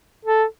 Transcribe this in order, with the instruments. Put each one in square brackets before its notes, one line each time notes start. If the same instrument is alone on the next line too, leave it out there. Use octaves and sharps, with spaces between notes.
[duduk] A4